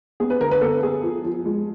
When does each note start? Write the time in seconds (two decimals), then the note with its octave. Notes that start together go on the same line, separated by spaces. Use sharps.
0.20 B3 G#4
0.30 B4
0.40 D3 A#4
0.51 B4
0.61 B3 A4
0.83 B3 G#4
1.03 F3
1.24 F3
1.46 G#3